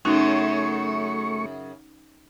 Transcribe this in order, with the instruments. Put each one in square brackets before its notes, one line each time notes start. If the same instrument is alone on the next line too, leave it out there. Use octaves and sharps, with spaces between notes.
[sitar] F#2 C#3 [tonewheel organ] A3 C#6 [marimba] C#4 D#4 F#4